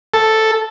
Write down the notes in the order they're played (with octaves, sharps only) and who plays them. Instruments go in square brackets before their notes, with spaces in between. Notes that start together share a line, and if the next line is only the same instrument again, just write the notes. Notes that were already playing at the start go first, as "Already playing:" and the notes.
[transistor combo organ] A4